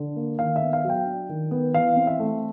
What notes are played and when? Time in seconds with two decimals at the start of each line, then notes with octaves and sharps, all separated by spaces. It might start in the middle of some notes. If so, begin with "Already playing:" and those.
Already playing: D3
0.16 A#3
0.39 D#3 F5
0.56 E5
0.61 B3
0.73 F5
0.84 F#3
0.89 G5
1.06 D4
1.29 D#3
1.51 B3
1.74 E3 F5
1.96 C4
2.07 E5
2.19 A3